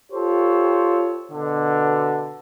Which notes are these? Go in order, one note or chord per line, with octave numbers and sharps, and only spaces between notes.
F4 G4 A4 C5 C#5
B2 D3